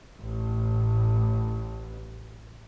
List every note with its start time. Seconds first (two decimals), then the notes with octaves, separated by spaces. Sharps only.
0.22 A1 A2